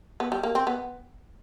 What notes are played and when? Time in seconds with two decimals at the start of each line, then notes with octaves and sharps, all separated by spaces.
0.20 B3
0.32 G3
0.43 A#3
0.55 C4
0.67 B3